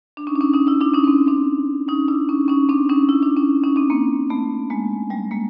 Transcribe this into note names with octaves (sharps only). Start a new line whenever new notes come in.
D4
C#4 D#4
D4
C#4 D#4
C#4 D#4
D4 E4
D4 E4
C#4 D#4
C#4
C4 D4
C4 D4
C#4 D#4
D4 E4
C#4 D#4
C#4 D#4
C4 D4
C#4 D#4
D4 E4
D4 E4
C#4 D#4
C#4 D#4
C4 D4
A#3 C4
A3 B3
G#3 A#3
G3 A3
G#3 A#3